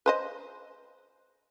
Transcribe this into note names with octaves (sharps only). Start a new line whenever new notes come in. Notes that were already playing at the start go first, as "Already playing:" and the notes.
B4 C5 D#5